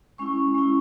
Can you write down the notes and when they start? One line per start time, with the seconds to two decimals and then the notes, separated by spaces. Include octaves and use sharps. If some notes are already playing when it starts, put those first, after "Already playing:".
0.18 G#3 C#4 E4 C#6
0.54 G#3 C#4 E4